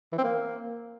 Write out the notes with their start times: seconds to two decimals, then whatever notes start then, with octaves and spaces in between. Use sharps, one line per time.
0.13 E3
0.18 C4
0.24 A#3